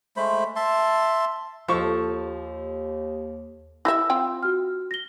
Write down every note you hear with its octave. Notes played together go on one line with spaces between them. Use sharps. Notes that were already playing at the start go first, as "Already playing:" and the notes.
G#3 A3 C5 B5
E5 A5 C6
D#2 F3 A4 C#6
E4 G4 E5 E6 A#6
C4 F4 G5
F#4 F6
A#6 G7